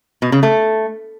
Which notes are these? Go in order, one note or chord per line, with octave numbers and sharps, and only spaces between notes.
B2
C#3
A3